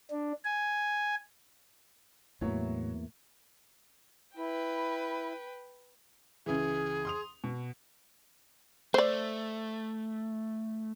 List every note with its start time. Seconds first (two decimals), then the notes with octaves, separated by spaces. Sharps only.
0.11 D4
0.44 G#5
2.41 E2 A2 E3 F#3 A3 A#3 C#5
4.37 E4 B4 G5
6.46 C#2 E3 G#4
7.05 C6 D#6 F7
7.44 B2
8.94 A3 C5 D5